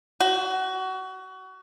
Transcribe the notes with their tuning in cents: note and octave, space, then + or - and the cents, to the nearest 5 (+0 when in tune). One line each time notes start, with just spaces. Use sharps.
F#4 +25